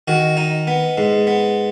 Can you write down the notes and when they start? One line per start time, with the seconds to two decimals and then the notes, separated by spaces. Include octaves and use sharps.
0.08 D#3 F#4
0.37 D#4
0.67 B3
0.98 G#2
1.27 B3